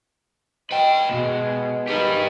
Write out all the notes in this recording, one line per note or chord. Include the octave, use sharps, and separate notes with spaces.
B4 D#5 G5
D2 B2 G#3
D#3 G4 B4